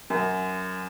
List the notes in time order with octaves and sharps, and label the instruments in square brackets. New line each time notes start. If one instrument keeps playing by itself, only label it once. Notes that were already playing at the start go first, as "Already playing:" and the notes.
[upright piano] F#2